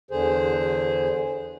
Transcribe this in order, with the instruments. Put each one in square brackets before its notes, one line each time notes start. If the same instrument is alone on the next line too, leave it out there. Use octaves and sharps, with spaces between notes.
[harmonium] E2 D3 G#4 C5